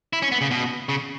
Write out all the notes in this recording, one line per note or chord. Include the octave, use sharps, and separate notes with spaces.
E4
C#4
B3
C#3
B2
C#3